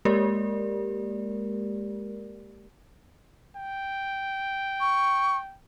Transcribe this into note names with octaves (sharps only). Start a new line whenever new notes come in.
G#3 A#3 G4 A#4 D5
G5
C#6